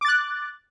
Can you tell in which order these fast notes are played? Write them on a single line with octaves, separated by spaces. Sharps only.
D6 A6 F#6